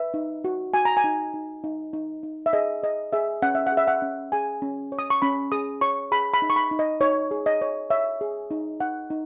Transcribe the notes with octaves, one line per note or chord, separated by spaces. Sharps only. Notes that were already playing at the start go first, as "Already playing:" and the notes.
Already playing: B4 E5
D#4
F#4
F#4 G#5
A#5
G#5
D#4
D#4
D#4
D#4
D#4
E5
G#4 D#5
G#4 D#5
G#4 E5
C#4 F#5
E5
F#5
G#4
E5
F#5
C#4
G#4 G#5
C#4
C#5
D#6
C#6
C#4 B5
G#4 D#6
C#5 C#6
G#4 B5
B5
D#4
C#6
B5
D#4
D#5
D#4 C#5
G#4
D#5
C#5
C#5 E5
G#4
D#4
D#4 F#5
D#4